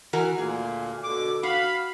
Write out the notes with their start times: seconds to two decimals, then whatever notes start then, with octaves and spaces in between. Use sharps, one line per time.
0.13 E3 F#4 A#4
0.38 D2 A#2 A#3 G#4
1.04 B2 D3 D6
1.43 F#4 F5 B5